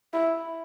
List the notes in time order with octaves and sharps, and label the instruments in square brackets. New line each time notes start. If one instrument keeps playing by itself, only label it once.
[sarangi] E4